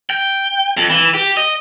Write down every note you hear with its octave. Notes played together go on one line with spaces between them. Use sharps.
G5
F2
E3
G4
D#5